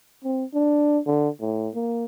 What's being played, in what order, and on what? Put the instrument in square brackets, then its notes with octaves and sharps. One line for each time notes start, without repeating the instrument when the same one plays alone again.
[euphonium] C4
D4
D3
A2
A#3